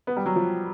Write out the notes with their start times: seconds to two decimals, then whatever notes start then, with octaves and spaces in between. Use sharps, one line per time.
0.07 B3
0.16 G3
0.26 F#3
0.36 F3